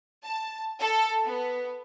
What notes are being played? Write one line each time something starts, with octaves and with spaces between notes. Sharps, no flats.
A5
A4
B3